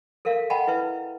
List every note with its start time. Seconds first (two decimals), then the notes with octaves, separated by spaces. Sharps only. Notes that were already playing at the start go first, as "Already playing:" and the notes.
0.25 A4 A#4 E5 F5
0.50 D#5 F#5 G5 A5 B5
0.67 E4 B4 E5